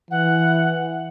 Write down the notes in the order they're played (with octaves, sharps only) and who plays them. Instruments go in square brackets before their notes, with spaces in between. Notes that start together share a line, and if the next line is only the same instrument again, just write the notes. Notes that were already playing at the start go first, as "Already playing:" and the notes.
[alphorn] E3 [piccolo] F#5